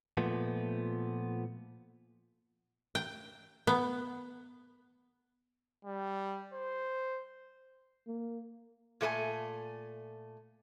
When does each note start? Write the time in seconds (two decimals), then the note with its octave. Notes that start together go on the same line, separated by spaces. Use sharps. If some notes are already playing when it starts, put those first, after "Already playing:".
0.17 A#2 F3 A3 B3
2.95 G5
3.67 B3
5.85 G3
6.54 C5
8.07 A#3
9.01 A#2 A3 C5 G#5